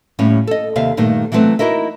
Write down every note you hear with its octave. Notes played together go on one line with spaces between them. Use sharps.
D#2 A2 G3 C#4
A4 D#5
D#2 C3 E5 F5
G2 A#2 D#3 A3
E3 F#3 A3 B3 C4
D#4 E4 F#4 A#4 D#5 E5